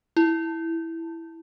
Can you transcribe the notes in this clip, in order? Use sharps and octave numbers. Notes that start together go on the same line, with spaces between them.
E4